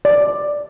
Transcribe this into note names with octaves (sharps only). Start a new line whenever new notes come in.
D5